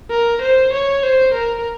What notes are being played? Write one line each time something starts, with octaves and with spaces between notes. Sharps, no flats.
A#4
C5
C#5
C5
A#4